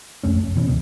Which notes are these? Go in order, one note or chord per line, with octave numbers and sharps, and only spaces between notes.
B1 F2 A3 C#4
F1
B2 E3 G#3 C#4
D1 C2 B2